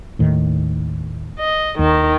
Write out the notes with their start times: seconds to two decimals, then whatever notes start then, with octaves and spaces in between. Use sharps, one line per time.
0.19 D#2 A2 D#3
1.39 D#5
1.79 D#2 D#3